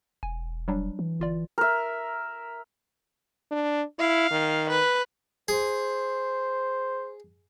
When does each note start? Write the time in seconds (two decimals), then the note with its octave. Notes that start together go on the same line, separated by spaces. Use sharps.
0.23 E1 G#5
0.68 F#3 G3 D4
0.99 E3
1.20 G1 F4 D5
1.58 A#4 E5
3.51 D4
3.99 E4 F5
4.31 D#3
4.69 B4
5.48 G#4 C5